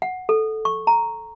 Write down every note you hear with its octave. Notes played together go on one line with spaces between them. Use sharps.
F#5
A4
C#6
A#5